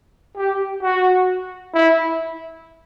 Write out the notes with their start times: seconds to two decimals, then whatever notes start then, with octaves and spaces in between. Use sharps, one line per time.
0.36 G4
0.82 F#4
1.74 E4